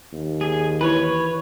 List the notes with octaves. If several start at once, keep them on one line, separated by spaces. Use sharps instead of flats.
D#2
G#4
E3 B4 C#5